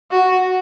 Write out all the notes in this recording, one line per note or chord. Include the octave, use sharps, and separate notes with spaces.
F#4